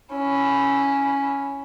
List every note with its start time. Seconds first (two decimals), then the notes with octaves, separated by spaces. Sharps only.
0.15 C#4 E4